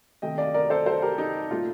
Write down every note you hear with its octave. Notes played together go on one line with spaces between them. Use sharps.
C3 D#3 A3 D#5 G5
D5 F5
A#4 D5
A4 C5
A4 C5
G4 A#4
D#4
A#2 A3 F4